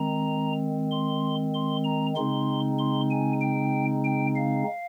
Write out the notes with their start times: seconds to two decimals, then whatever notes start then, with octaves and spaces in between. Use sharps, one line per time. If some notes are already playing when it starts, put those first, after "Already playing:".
Already playing: D#3 G#3 C4 A#5
0.91 C6
1.54 C6
1.84 A#5
2.16 C#3 G#3 C4 D#4 C6
2.78 C6
3.11 G#5
3.41 G5
4.05 G5
4.36 F5